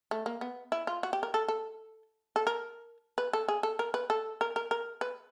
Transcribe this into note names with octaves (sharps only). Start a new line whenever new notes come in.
A3
A#3
B3
E4
F4
F#4
G4
A#4
A4
A4
A4
A#4
B4
A4
G#4
A4
A#4
B4
A4
A#4
A#4
A#4
B4